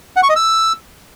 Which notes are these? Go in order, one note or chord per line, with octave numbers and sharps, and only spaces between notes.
F#5
C#6
D#5
E6